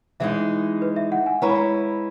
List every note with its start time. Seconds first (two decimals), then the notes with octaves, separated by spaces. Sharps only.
0.20 E3 G#3 D#4 E5
0.82 B4
0.96 E5
1.12 F#5
1.26 G#5
1.42 G#3 C#4 E4 B4 A#5
1.50 B5
1.57 A#5